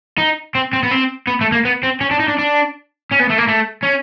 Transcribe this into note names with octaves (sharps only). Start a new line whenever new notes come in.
D#4
C4
C4
B3
C4
B3
A3
A#3
B3
C4
C#4
D4
D#4
D4
D4
C#4
B3
A3
A#3
A3
C#4